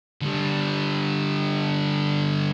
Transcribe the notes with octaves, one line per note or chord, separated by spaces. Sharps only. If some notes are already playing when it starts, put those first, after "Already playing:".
D3 G3